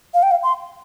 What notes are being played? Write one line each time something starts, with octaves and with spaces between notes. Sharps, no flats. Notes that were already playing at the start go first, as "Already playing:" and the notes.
F5
G5
F5
C6